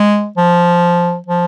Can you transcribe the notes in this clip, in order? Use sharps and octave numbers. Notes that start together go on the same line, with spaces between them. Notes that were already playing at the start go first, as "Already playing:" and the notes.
Already playing: G#3
F3
F3